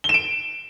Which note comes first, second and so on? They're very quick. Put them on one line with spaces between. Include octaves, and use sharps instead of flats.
G7 E7 D7